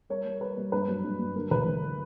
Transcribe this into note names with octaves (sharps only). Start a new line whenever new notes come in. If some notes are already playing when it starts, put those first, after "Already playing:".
G3 A#4 C#5
G3
G3 B4
G3
G2 B4
F#3
G2
F#3
D3 A#4
D2 B4
D2